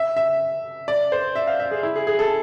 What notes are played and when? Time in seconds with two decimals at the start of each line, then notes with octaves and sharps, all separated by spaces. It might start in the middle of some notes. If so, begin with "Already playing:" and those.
Already playing: E5
0.17 E5
0.88 D5
1.12 C5
1.36 E5
1.47 F5
1.60 E5
1.71 G#4
1.83 E4
1.96 G#4
2.07 G#4
2.19 A4